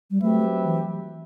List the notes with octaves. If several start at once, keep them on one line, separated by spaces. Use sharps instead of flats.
G3
F#3 A3 C4 G4 B4 E5
E3